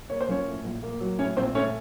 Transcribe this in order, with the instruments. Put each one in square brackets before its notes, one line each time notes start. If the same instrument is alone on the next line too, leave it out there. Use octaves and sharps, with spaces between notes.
[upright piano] A#3 C#5
C5
F3 C#4 C#5
A2
A#1
A#3
F#3
A2 C#4 C#5
A#1 C4 C5
A3 C#4 C#5